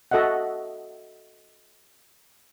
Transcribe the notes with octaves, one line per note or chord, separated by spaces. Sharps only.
F#4 A4 D#5 E5 F#5